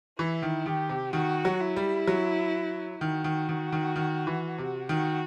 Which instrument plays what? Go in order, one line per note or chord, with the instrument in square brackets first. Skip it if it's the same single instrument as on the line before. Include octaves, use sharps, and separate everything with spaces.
[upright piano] E3 [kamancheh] E4
[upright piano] D#3
[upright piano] D#3 [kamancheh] G4
[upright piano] C3
[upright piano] D#3 [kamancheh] F#4
[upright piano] F#3
[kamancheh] E4
[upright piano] G3
F#3
[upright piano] D#3 [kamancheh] F#4
[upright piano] D#3
D#3
D#3
D#3
E3
C3
[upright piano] D#3 [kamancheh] F#4